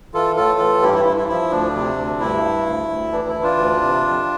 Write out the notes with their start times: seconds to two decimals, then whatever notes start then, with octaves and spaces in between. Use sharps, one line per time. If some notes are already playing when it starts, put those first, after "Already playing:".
0.14 E3 F4 A4
0.36 A2 F4 A4
0.60 E3
0.82 G2 E4 G4
0.94 E4
1.05 G2 E4
1.17 E4
1.28 F3 E4
1.51 D2 D4
1.75 C3
1.97 D2
2.20 G2 E4
2.43 G2
2.67 D2
2.89 D2
3.12 E3 D4
3.28 E4
3.36 E3
3.43 D4 F4
3.57 D2
3.81 C3
4.04 F2